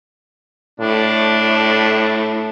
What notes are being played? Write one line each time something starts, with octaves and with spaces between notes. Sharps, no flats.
A2 D4